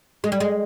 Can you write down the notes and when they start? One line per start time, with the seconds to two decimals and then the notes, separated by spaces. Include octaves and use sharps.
0.24 G#3
0.32 G3
0.40 G#3